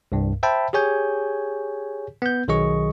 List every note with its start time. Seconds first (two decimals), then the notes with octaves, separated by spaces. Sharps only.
0.12 C2 G2
0.43 C5 E5 G5 A5 B5
0.73 G4 G#4 C#5 G#5 G6
2.22 B3 G6
2.48 B1 D#3 F#3 G#4 D#5 C#6